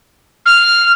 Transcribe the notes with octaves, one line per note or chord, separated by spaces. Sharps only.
F6